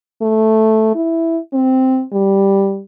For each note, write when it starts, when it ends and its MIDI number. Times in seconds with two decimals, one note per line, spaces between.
0.22 0.92 57
0.95 1.38 64
1.53 2.03 60
2.12 2.81 55